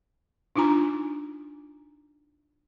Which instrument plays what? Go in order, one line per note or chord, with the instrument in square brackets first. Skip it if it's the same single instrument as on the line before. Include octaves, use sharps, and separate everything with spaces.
[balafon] D4 D#4 F4 G#5 A#5